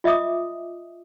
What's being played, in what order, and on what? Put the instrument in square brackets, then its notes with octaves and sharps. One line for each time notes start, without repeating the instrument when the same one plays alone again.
[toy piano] F4 D#5 E5 D6 D#6